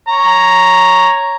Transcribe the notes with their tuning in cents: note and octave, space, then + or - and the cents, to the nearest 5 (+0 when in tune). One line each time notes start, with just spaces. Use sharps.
C#5 +0 A#5 +0